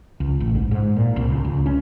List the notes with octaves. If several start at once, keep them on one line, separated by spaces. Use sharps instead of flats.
C#2
A1
G#2
G#2
A#2
C2
C#2
C#2
C#4